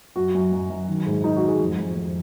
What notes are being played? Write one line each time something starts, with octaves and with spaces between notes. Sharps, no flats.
F#2 F#4
F#2
F#2
F#2
D#3
G#2
D#3 D#4
F#4
G#2
G#4
F2
F2
F2